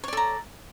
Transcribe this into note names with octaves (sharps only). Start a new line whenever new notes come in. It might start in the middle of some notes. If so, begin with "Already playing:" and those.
A4 C#5 D5 A#5